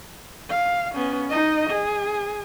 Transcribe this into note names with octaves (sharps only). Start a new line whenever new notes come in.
F5
B3 C#4
D#4 D#5
G#4